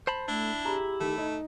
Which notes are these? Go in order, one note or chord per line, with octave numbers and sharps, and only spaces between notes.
C5 A5 B5
A3 D4 E4
G4 G#4 A#5 B5
D#3 A3
D#4